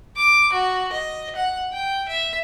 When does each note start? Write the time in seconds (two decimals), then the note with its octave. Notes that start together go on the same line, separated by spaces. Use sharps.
0.16 D6
0.53 F#4
0.92 D#5
1.36 F#5
1.73 G5
2.08 E5